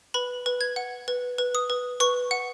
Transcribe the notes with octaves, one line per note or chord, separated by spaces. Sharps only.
B4 B5
B4
G#6
F#5
B4
B4
D#6
B4
B4 C#6
F#5